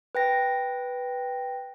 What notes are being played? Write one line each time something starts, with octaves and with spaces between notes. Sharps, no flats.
B4 G5 A#6